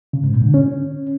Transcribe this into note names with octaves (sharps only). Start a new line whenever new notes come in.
C#3
G#2
A#2
D3
C#4